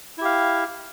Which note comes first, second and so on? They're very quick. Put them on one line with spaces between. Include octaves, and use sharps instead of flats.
E4 G4 F5